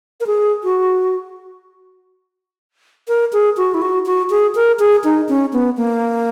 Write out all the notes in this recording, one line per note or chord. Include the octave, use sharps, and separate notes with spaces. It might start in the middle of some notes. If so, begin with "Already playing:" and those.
A#4
G#4
F#4
A#4
G#4
F#4
E4
F#4
F#4
G#4
A#4
G#4
D#4
C#4
B3
A#3